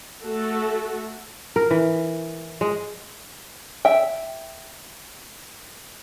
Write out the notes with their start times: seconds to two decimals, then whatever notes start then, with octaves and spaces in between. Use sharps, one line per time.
0.24 A3 F#4 A4
1.56 A#4
1.71 E3
2.61 G#3
3.85 E5 G5